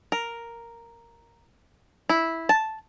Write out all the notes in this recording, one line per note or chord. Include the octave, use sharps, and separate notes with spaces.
A#4
E4
A5